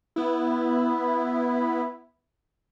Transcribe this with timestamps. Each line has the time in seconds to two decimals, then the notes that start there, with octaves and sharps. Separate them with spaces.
0.16 B3 E4